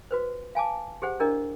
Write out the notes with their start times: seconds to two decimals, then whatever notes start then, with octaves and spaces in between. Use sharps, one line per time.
0.11 F#4 B4 C5
0.55 F5 G#5 A5 D6
1.02 G4 G#4 C5 F#5
1.20 D4 E4 G#4 A#4 D5 D#5